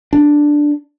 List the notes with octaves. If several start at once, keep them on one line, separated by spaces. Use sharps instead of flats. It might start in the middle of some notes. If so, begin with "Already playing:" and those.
D4